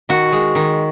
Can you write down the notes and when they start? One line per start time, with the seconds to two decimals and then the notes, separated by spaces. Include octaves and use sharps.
0.09 D#3 F#4
0.32 G#3
0.55 D#3